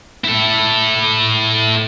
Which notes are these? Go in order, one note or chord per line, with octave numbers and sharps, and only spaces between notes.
E4 A4